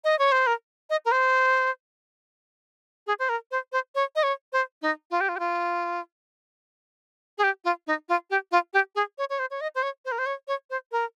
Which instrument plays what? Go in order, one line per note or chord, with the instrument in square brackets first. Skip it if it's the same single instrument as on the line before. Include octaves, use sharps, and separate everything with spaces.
[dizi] D#5
C#5
C5
A#4
D#5
A#4
C5
G#4
C5
A#4
C5
C5
C#5
D#5
C#5
C5
D#4
F4
G4
F4
G4
F4
G#4
G4
F4
D#4
F4
G4
F4
G4
G#4
C#5
C#5
C5
C#5
D#5
C5
C#5
C5
A#4
C5
C#5
C#5
C5
A#4